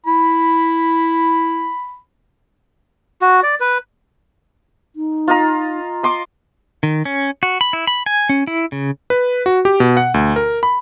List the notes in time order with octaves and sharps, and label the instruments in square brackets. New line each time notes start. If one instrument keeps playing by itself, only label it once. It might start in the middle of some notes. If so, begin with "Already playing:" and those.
[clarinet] E4 [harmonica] B5
[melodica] F#4
D5
B4
[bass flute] D#4
[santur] F4 D#5 A#5
D#5 C6 D6
[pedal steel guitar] D#3
C#4
F#4
B5
E4
B5
G#5
C#4
E4
C#3
[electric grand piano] B4
F#4
G4
B2
F#5
D2
A#4
B5